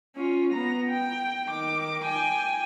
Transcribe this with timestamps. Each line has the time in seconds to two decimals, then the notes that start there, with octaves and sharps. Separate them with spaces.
0.16 C#4 F4
0.53 B3 A#5
0.89 G5
1.48 D#3 D6
2.04 G5 G#5